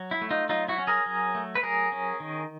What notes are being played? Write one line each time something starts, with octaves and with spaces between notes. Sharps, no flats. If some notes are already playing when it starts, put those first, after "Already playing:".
Already playing: F#3
E4
A3
D#4 F4
F#3 D#4 F4
E4 F#4
C#4
G#4 A#4
F#3
A3
B4
F#3 G#4 A#4
C#4
D#3